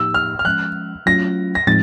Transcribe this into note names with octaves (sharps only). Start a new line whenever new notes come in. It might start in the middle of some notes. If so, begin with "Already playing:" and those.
Already playing: A2 F3 A#3 D#4 G4 E6
F6
F6
F3 G#3 C#4 F#6
F#3 A3 C#4 F4 A#6
A#6
A2 F3 G#3 C4 D#4 A6